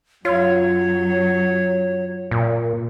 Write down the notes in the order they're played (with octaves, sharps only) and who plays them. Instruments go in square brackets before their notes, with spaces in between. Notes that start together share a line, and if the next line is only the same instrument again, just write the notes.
[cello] F#2 F#3 [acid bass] F4 [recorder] C#5
[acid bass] A#2